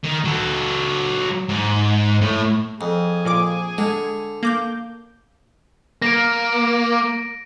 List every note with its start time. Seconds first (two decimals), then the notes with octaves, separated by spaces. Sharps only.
0.04 D#3
0.25 F#3 A4
1.49 G#2
2.21 A2
2.81 F2 G#4
3.25 A#2 F3 D6
3.78 D3 G#3
4.43 A#3 D6 G6
6.02 A#3 A#6 D7